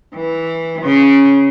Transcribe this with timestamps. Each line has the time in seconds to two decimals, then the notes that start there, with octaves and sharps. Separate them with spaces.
0.15 E3
0.82 C#3